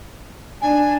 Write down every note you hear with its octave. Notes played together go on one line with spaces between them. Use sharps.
D4 G#5